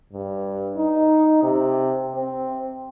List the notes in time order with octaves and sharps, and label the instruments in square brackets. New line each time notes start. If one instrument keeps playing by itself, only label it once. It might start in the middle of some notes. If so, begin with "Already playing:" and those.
[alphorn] G2
D#4
C3
C4